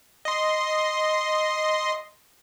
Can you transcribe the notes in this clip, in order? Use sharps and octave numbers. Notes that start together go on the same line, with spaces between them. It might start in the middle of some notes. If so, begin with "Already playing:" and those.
D#5 C6